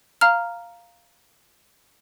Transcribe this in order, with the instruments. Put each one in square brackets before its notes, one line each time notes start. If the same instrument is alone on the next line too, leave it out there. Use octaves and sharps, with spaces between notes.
[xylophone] F5 A#5 F6